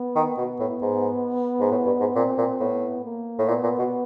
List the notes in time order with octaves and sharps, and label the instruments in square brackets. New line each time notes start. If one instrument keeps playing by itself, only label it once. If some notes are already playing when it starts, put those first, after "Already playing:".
Already playing: [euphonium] B3
[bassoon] D#3
[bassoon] B2 [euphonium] B3
[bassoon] A2
G#2
G#2
A2
G2
G#2
[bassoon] A#2 [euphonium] C4
[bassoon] A#2
[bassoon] A2 [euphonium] B3
[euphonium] A#3
[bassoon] A2
[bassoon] A#2 [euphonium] B3
[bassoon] A#2
B2